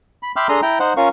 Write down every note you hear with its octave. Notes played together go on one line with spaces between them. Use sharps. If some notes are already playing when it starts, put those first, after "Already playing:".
B5
E5 G5 B5 C6 D6 F6
D4 G#4 A4 A#5 C6 D#6
E4 G5 A#5
D#4 C5 F#5
C#4 F4 A#4 F5 C#6